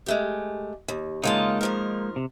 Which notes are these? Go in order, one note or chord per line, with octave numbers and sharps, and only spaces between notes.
G#3 A3 G4
D#2
C#3 G#3 A#3 D#4 F4 A5
D#3 F3 A#4
C3